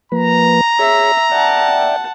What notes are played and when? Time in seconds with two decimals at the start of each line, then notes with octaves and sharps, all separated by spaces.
0.12 F3 A#3 B4 A#5
0.79 G#4 C#5 E5
1.32 D5 E5 F#5 G5 A5